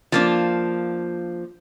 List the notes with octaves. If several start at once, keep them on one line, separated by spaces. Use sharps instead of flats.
F3 A#3 D4